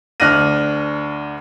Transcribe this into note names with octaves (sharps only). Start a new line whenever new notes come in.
D2 D4 F6 F#6 A#6 D#7